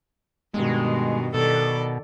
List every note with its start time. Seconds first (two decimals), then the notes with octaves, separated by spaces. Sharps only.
0.54 G2 B2 D#3 G#3
1.34 B2 D#3 A4 D5